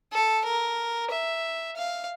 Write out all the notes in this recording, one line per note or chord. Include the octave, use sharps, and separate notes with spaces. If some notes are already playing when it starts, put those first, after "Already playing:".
A4
A#4
E5
F5